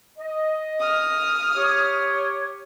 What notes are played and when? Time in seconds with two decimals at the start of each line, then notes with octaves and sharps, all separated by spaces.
0.18 D#5
0.80 D#6 F6
1.56 G4 C#5